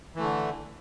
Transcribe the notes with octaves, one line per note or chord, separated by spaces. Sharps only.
D3 E3 A3